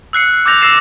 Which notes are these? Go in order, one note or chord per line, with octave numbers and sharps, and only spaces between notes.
E6 F#6 C7 C#7
D6 E6 G6 A6 A#6 F7
D6 E6 A6 A#6 C7 E7